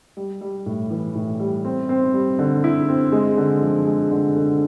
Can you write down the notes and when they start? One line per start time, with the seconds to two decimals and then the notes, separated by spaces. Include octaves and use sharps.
0.17 G3
0.41 G3
0.66 A2
0.91 E3
1.15 A2
1.40 G3
1.65 C4
1.89 C4
2.14 G3
2.39 D3
2.64 E4
2.89 C4
3.12 G#3
3.37 D3
3.62 F3
3.86 G#3
4.11 D3
4.36 D3